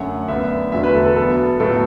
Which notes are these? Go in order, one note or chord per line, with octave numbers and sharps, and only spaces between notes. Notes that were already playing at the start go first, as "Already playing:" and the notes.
Already playing: F#2 D3 A3 F#5
D2 D3 B3 E5
E2 D3 F#3 A3 E5
B4
A4
A4
B2 B3 A4
A2 F#3 B3 A4